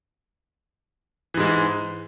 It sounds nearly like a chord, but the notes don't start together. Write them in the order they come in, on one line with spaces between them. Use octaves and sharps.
E3 G#2 G#3